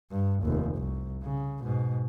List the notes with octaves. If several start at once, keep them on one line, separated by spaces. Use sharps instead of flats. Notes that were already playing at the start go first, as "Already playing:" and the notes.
G2
F1 D#2
C2
C#3
G#2 B2